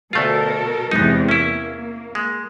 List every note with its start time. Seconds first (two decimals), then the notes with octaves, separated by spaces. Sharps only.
0.13 D2 B2 A3 F4 A4 A#4
0.91 E2 C3 G#3 B3 D#4
1.29 A#3 C#4 E4
2.15 G#3